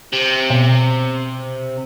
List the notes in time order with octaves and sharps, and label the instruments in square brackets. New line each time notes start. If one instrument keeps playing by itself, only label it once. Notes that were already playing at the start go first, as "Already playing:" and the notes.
[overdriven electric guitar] C3
[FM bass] B2